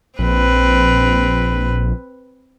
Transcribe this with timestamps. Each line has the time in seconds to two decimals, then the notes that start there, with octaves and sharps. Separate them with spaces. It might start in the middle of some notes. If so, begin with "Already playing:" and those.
0.19 A#1 C4 B4